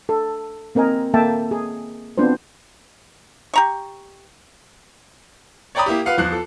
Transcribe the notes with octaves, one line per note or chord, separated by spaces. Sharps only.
A4
A#3 C4 A#4 D#5 G#5
A#3 A4 E5 G5 A5
G#4
B3 C4 D4 F4 C5
G4 A#5 C#6
C#5 D5 G5 A#5 B5 D#6
A#3 E4 G4
F4 B4 F5 F#5
E2 F3 F#6 C7
A4